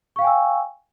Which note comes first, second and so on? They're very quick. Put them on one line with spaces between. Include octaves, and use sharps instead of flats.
C#6 F5 G5 G#5 E6